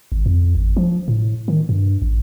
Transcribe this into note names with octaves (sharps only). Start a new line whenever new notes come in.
G#1
F2
G#1
F3
A2
D#3
G2
A1